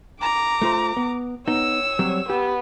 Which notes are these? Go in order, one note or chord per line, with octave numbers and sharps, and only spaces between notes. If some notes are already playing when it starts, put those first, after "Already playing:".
A#5 D6
A3 F4 C5
B3
B3 D#4 C#5 E6
F#3 G3 C4
B3 G4